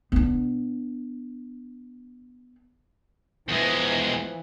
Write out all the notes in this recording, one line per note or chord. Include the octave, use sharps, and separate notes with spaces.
B3 D4
E2 E3 F3 G#3